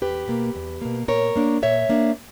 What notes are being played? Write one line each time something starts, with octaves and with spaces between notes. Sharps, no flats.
E2 G4 B4
B2 A#3
E2
B2 A#3
A#2 A#4 C#5
A#3 D4
A#2 C#5 E5
A#3 D4